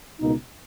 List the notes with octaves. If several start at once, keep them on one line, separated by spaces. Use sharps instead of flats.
C#2 B2 A#3 D#4